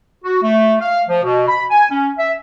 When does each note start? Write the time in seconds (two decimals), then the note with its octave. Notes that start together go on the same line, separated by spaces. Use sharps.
0.24 F#4
0.43 A3
0.81 F5
1.09 F3
1.23 B2
1.48 B5
1.70 G#5
1.91 C#4
2.19 E5